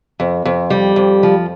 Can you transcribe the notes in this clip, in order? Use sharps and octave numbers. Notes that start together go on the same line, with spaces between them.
F2
F2
G3
F2
F3